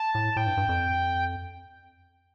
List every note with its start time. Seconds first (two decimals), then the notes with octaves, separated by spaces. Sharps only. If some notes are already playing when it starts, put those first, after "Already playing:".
Already playing: A5
0.15 A2
0.36 A2 G5
0.47 G2
0.57 G2
0.69 F2